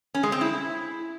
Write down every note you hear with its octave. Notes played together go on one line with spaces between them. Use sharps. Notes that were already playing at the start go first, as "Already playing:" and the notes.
C#4
G#3
C4
E4